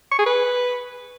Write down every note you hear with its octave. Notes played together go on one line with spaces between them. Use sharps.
C#6
G#4
B4